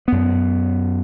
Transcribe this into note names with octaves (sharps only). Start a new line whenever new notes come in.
F#2 B3